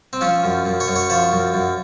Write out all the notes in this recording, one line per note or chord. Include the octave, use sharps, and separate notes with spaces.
C4
F3 C#4
F#2
F#2
C#5
F#2
C#5
F3 C#5
F#2
F#2